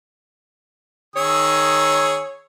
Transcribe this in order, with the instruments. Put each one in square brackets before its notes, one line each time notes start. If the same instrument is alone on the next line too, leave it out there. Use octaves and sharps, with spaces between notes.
[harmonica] D#3 G#4 E6 [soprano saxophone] C#5